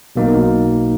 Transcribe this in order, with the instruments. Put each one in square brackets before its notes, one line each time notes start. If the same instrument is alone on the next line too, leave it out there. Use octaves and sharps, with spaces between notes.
[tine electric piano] B1 B2 A#3 D#4